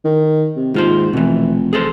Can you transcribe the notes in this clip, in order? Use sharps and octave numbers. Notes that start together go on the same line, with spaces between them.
D#3
C3
D#2 G#2 F4 C5
F1 B2 E3
G#4 A4 C5